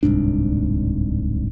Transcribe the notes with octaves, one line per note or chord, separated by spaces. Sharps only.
D1 C2 G#2 D4